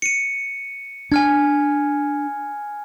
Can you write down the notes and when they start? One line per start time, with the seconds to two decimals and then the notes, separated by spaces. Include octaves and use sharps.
0.02 C#7 D#7
1.12 D4 G#5 F6 G#6